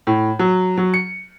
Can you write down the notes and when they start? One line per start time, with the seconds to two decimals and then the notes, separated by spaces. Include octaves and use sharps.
0.07 A2
0.39 F#3
0.77 F#3
0.94 C#7